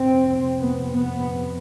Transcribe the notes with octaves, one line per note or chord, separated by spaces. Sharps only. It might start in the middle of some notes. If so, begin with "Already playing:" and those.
Already playing: F2 C3 C4
B3
B3